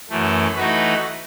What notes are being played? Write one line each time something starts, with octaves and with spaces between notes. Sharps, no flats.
F#2 E3 A3
E3 A3 D#4 F#4 B4